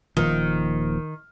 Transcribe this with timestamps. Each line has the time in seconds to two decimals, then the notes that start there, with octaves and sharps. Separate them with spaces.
0.17 D#1 D#2 D#3 F3